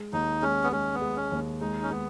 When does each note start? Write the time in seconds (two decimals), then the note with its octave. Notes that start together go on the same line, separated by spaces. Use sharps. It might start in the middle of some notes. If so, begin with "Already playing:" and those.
Already playing: G#3
0.13 D#2 D#4
0.42 G#3 C#4
0.64 B3
0.72 G#3 C#4
0.94 B3
1.01 G#3
1.17 C#4
1.32 D#2
1.61 G#3 D#4
1.82 C#4
1.90 G#3 B3